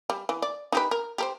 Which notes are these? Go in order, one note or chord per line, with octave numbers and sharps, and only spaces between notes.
G3
E3
D5
D#4 G4 B4
A#4
G4 A#4 C5